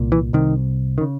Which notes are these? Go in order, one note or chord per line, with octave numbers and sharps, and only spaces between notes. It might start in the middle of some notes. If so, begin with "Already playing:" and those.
Already playing: C2 A#2
E3
C2 C3 D#3
D#3
C#3